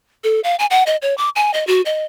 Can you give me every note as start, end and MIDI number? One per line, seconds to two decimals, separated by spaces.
0.24 0.40 69
0.44 0.56 77
0.59 0.66 80
0.71 0.83 78
0.86 0.96 75
1.02 1.16 73
1.18 1.29 86
1.36 1.53 80
1.54 1.66 75
1.67 1.82 66
1.86 2.05 75